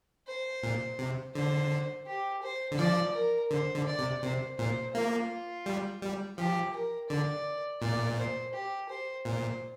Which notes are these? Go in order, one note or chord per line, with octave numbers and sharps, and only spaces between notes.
C5
A#2
C3
D3 C5
G4
C5
D3
F3 D5
A#4
D3 C5
D3
D5
C3
C3 C5
A#2 C5
A#3 F4
G3
G3
F3 G4
A#4
D3 D5
A#2 D5
C5
G4
C5
A#2 C5